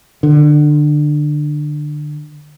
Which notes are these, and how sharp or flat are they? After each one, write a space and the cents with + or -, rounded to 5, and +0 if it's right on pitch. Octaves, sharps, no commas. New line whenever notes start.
D3 +25